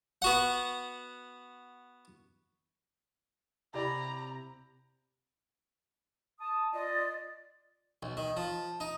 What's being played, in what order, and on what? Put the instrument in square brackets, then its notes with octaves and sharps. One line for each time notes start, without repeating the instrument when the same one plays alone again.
[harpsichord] B3 F#4 F#5
[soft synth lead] C3 [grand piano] E4 D5 [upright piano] G4 B5 [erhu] A#5
[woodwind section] A5 D#6
[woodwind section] F4 D#5 [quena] D5
[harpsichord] B1
D#3
F3
D#4